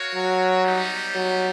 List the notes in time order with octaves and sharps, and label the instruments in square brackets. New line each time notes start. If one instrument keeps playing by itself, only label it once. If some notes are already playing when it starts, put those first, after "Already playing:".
Already playing: [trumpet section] F#4 A#4 C#5 F5
[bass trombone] F#3
[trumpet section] G3 B3 D#4
[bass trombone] F#3